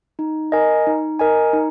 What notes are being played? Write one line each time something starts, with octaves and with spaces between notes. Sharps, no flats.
D#4
A#4 D#5 G#5
D#4
A#4 D#5 G#5
D#4